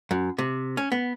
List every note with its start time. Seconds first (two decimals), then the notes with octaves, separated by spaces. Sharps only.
0.11 F#2
0.38 C3
0.77 C#4
0.92 B3